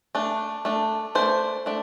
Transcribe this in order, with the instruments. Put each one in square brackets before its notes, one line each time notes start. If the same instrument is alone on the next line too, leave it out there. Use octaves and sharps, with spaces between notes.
[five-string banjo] A3 D4
A3 D4
A3 D4 C5
A3 D4